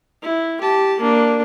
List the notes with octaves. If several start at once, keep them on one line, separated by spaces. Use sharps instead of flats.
E4
G4 A5
A#3 D4